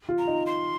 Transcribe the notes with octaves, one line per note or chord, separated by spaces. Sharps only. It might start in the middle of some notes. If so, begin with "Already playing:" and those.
F4
A#5
D#4
C6